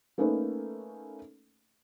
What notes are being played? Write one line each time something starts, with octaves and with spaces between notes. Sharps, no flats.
A3 A#3 C#4 D#4 A4 B4